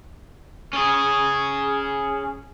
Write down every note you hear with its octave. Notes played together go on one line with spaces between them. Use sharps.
C#4 G#4